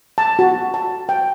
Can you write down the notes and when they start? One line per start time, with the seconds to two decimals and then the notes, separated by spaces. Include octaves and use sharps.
0.18 A5
0.39 F#4
0.74 A5
1.09 G5